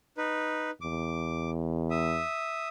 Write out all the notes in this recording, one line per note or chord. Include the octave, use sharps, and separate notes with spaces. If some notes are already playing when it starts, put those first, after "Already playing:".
D#4 B4
E2 D6
E5 D#6